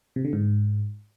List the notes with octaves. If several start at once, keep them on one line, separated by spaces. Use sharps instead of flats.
C3
D3
G#2